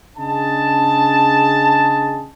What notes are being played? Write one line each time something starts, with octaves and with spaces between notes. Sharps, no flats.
C#3 D4 G#4 D#5 A5